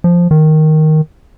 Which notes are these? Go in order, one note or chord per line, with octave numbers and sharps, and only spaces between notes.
F3
D#3